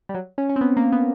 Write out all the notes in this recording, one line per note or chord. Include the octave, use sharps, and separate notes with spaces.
G3
F#3
C#4
C#4
C4
B3
A#3
B3